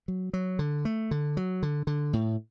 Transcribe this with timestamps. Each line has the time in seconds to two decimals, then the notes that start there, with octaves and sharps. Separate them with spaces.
0.08 F#3
0.33 F#3
0.59 D3
0.85 A3
1.11 D3
1.37 F#3
1.63 D3
1.87 D3
2.13 A2